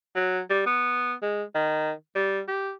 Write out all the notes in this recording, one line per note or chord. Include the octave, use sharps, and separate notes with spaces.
F#3
G3
B3
G#3
D#3
G3
G4